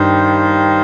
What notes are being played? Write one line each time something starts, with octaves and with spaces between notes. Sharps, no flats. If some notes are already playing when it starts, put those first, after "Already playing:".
Already playing: G2 D#3 G3 D#4 G4 C5